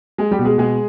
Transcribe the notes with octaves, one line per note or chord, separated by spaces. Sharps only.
G#3 G#4
G3 G4
B2
G#3 G#4
B2 G#3 G#4